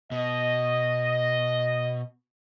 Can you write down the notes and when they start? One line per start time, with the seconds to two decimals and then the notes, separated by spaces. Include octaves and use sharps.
0.11 B2 D#5